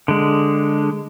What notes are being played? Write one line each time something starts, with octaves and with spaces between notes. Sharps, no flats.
D3 G#3